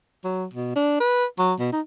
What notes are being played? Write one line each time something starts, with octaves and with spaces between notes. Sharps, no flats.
F#3
B2
D4
B4
F#3
B2
D#4